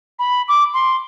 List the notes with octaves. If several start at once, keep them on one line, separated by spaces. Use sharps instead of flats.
B5
D6
C6